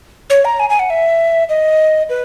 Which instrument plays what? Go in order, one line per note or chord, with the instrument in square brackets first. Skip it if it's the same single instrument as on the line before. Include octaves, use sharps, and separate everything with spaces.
[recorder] C#5
A#5
G#5
G#5
F#5
E5
D#5
B4